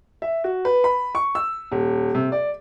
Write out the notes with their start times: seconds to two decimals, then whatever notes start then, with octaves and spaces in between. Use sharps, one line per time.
0.22 E5
0.44 F#4
0.65 B4
0.84 B5
1.15 C#6
1.35 E6
1.71 D#1
2.15 C3
2.32 D5